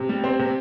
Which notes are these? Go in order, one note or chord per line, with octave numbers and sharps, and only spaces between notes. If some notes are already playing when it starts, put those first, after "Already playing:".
Already playing: C3
G3
C4
C3